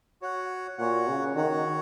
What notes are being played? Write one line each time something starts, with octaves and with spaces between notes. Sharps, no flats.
F#4 C#5 F#5
A#2 F#4 C#5 F#5
C#3
D#3 F#4 C#5 F#5